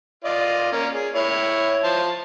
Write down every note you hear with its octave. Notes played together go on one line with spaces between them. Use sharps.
F4 D5 D#5
A#3 C#4
G#4
E4 C#5
F3 C5 A5